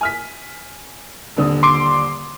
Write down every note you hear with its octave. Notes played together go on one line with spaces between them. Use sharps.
G#5 F6 B6
D#1 D3 D#6
C6 D6